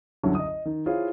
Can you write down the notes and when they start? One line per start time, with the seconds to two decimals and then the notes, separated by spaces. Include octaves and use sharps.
0.23 C2 F#2 D3 F#3
0.35 D#5 D#6
0.46 D#5
0.65 D#3
0.86 E4 F4 G#4 C5 C#5 F5